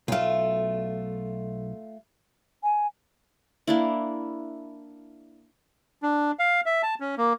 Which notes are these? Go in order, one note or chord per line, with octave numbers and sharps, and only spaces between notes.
B1 A3 F4 F5
G#5
A#3 D4 E4
D4
F5
E5
A5
C#4
A#3